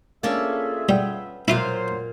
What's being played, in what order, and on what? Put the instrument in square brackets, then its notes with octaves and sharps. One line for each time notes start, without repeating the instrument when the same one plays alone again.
[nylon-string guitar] A#3 D4 [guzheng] C#4 A4 D5 [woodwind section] F4 G#4 E5
[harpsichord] G3 [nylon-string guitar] B3 G5
[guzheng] A#2 F5 [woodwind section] F#3 C5 [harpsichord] E4 F4